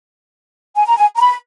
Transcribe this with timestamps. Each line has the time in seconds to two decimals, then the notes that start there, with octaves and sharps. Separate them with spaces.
0.76 G#5
0.86 A#5
0.97 G#5
1.16 A#5
1.20 B5